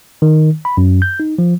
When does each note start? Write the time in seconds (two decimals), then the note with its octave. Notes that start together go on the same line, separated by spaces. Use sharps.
0.22 D#3
0.65 B5
0.77 F#2
1.02 G6
1.20 D#4
1.38 F3